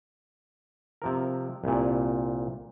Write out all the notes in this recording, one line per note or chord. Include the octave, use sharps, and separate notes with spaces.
C3 F3 A#4
C2 A#2